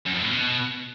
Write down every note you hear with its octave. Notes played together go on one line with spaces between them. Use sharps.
F#2
F2
A2
B2